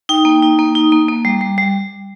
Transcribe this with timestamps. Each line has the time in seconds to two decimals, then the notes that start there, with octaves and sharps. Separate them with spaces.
0.09 D#4 G5
0.25 A#3
0.42 D#4
0.59 A#3
0.75 D#4
0.92 A#3
1.09 A#3
1.25 G3
1.41 G3
1.58 G3